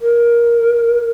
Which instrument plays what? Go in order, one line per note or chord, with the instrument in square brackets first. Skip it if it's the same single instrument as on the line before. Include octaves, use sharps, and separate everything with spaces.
[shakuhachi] A#4